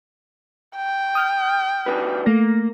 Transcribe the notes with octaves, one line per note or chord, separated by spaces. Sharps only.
G5
D#6 F6 G6
D4 F#4 B4
A3 A#3 A#6